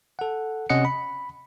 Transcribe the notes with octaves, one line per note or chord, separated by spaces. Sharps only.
A4 F#5
C3 C#4 D#5 F#5 C#7
B5